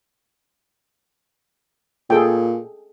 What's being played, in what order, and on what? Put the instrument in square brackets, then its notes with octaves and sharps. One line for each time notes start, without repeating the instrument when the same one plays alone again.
[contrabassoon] A#2 [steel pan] G#4 A4 G5